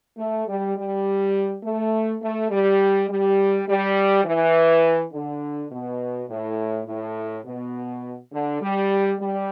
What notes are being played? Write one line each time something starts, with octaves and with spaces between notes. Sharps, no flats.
A3
G3
G3
A3
A3
G3
G3
G3
E3
D3
B2
A2
A2
B2
D3
G3
G3